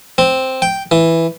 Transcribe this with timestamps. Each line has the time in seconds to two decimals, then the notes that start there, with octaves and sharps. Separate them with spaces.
0.18 C4
0.62 G5
0.91 E3